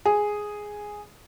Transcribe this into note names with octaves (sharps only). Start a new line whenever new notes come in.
G#4